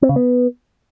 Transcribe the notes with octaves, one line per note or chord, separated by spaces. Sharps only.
C4
C#3
B3